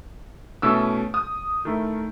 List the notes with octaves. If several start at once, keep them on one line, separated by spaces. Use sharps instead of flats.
B2 A3 C#4 E4 E6
D#6
D#3 A3 E4